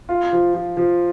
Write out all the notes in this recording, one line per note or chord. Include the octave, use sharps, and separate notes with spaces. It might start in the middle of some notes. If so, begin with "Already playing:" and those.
F4
F3
F3
F3